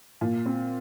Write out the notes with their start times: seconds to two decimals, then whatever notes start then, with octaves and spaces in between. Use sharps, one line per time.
0.21 A#2
0.46 C4